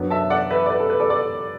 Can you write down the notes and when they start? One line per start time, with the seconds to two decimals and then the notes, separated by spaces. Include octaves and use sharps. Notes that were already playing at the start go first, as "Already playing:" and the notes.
Already playing: F#2 F#3 B3 D4
0.10 E5 A5
0.30 D5 F#5
0.50 B4 E5
0.66 D5
0.70 B4
0.80 A4
0.90 B4
1.00 A4 D5
1.10 A4 D5